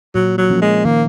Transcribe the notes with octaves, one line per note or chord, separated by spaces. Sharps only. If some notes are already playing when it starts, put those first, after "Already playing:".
A#2 F#3
F#3
F3 A#3 C#4
G#3
D#3 A#3